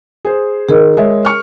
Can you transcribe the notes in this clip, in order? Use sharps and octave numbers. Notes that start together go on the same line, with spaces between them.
G#4 C5
D#3 G#4 A#4 D#5
G#3 C#5 E5
C#6 F6